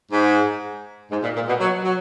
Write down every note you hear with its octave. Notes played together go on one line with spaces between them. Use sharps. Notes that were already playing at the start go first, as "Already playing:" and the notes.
G#2
G#2
A#2
A#2
B2
F#3
F#3